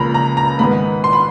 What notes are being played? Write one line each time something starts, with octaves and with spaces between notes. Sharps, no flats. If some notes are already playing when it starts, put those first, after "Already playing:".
Already playing: C#2 C#3 F3 A#3 A#5 B5
A#5
A#5
G#2 D#3 G#3 B3 B5
C6
B5